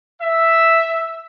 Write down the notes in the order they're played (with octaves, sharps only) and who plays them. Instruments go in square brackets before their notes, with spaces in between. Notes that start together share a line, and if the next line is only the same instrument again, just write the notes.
[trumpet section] E5